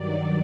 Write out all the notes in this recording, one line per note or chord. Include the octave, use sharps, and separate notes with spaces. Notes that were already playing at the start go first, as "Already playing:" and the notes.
Already playing: G2 D#3 F#3 D5